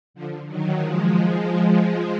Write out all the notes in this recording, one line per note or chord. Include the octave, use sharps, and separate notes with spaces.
D3 F3
D#3 F#3
F3 G#3
F3 G#3